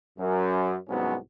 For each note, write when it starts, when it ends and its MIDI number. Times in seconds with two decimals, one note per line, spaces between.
0.18 0.77 42
0.88 1.15 36
0.88 1.15 44
0.88 1.15 54
0.88 1.15 59
0.88 1.15 61